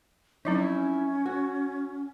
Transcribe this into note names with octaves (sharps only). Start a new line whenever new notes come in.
F3 F#3 C4 C#4 D#4 E4
F#4